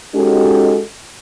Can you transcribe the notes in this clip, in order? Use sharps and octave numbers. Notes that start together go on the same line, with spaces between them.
G#3 C#4 D#4 F#4 G4 A4